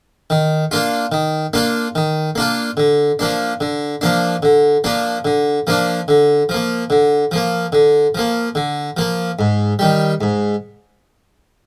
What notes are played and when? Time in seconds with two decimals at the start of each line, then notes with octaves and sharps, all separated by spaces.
0.30 D#3
0.71 A#3 D4 F4
1.12 D#3
1.53 A#3 D4 F4
1.95 D#3
2.35 A#3 D4 F4
2.77 D3
3.19 F3 A#3 D4
3.60 D3
4.01 F3 A#3 D4
4.43 D3
4.84 F3 A#3 D4
5.25 D3
5.67 F3 A#3 D4
6.08 D3
6.49 F3
6.54 A#3
6.90 D3
7.31 F3 A#3
7.72 D3
8.15 F3 A#3
8.55 D3
8.97 F3 A#3
9.39 G#2
9.79 D#3 G3
10.21 G#2